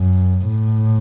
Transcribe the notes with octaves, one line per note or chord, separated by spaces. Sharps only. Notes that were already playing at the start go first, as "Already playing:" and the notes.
Already playing: F#2
A2